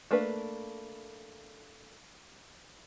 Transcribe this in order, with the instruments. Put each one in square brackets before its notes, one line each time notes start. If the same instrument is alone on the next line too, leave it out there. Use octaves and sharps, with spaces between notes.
[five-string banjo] A3 A#3 D4 B4